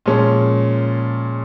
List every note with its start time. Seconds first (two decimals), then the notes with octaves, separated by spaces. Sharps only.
0.06 A#2 F3 G#3 C#4